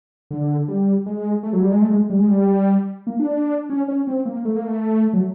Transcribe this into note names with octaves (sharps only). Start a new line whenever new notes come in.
D3
G3
G#3
A3
F#3
G3
G#3
A3
G#3
G3
G#3
G3
A#3
D4
C#4
C#4
C4
A#3
A3
A#3
A3
F#3